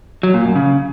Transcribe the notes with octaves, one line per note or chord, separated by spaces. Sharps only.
F#3
A#2
F#2
C#3